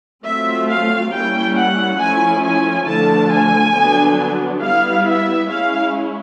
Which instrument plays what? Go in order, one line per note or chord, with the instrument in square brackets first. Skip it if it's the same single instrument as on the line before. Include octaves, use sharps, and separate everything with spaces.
[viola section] F#3 A3 C4 F4 E5
F5
G3 A#3 C#4 E4 G5
F#5
F3 A3 C#4 E4 G#5
G#5
D3 F3 A3 A5
G#5
D3 F#3 B3 D4
G3 B3 E4 F5
E5
G#3 C#4 E4 F5